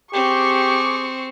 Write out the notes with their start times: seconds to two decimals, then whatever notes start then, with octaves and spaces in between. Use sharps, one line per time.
0.13 C4 G4 G#4 C#6 D6